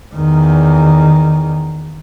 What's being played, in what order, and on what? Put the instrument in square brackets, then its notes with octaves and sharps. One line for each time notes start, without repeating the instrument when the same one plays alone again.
[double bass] E2 D#3